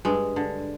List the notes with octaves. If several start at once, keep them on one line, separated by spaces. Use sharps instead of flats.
G2 G#3
D3